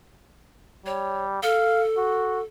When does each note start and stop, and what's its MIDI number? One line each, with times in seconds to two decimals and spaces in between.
0.86 1.41 55
0.86 1.24 73
1.43 2.43 69
1.43 1.83 77
1.98 2.40 66